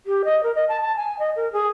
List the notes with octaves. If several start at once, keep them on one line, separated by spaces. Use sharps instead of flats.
G4
D#5
A#4
D#5
A5
A5
G#5
D#5
A#4
G#4